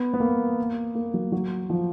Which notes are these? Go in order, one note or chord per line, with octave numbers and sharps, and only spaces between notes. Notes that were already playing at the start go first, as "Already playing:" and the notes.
Already playing: B3
B3
A#3
A#3
F#3
F#3
F3